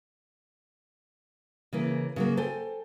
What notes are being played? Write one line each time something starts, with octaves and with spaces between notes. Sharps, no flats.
C#3 E3 A#3
C#3 F#3 A#3
A4 C5 G5 G#5